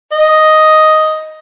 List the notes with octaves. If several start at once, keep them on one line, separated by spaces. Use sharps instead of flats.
D#5